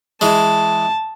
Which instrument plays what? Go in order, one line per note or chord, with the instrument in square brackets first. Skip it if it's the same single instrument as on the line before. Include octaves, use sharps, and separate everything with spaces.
[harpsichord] E3 G#3 [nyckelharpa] A5